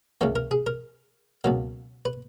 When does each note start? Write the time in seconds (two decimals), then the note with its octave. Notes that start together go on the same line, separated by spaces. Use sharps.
0.21 C#2 C#3 E3 A#3
0.36 A#4
0.51 G#4
0.67 A#4
1.44 C#2 B2 F#3 A#3
2.05 B4